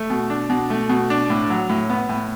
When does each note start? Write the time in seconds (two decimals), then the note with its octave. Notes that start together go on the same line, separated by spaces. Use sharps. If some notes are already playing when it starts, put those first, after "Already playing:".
Already playing: A3
0.10 B2
0.30 D4
0.50 B2
0.70 A3
0.89 B2
1.10 D4
1.30 A2
1.50 F#3
1.69 A2
1.90 B3
2.09 A2